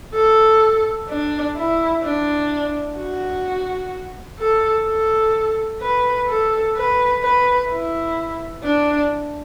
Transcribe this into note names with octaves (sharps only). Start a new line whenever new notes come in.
A4
D4
E4
D4
F#4
A4
A4
B4
A4
B4
B4
E4
D4